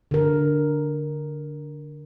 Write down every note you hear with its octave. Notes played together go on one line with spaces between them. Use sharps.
D3 A#4